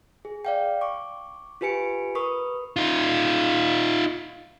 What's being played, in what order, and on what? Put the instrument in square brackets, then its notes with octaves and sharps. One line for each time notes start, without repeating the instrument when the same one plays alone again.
[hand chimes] G#4
D5 F5 G5
C#6 D6
F4 G4 B4 G#5 C#7 D7
A#4 B4 C#6 D#6
[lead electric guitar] D#4 F4